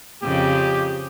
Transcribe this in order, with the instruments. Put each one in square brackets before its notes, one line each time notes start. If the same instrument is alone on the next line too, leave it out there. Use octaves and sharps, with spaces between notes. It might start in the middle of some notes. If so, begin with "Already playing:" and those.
[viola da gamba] F2 C#3 [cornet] G4